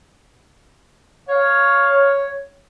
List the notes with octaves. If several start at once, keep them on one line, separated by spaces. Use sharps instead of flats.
C#5 F5